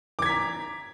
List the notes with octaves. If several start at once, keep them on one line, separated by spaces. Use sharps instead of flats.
A#5 D6 G#6 B6